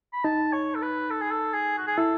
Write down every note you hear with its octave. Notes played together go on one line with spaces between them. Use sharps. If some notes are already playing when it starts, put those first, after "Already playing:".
B5
D#4 A5
C#5
A4
B4
A4
G#4
A4
G#4
F#4
G#4
E4 A4